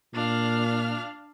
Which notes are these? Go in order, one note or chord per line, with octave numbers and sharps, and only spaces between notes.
A#2 D4 F5 F6